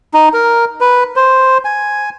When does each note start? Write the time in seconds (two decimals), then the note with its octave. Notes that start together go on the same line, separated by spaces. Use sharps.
0.14 D#4
0.34 A#4
0.81 B4
1.16 C5
1.65 G#5